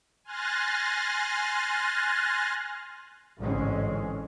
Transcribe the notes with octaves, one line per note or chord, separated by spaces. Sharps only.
G#5 C6 F6 F#6 A6 A#6
A1 G#2 D3 G#3 C4 C#4